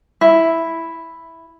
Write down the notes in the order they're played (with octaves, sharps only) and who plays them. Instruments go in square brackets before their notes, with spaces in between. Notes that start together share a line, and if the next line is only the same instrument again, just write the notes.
[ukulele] E4